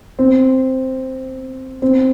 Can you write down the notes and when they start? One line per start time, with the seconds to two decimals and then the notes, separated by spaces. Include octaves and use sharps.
0.19 C4
1.82 C4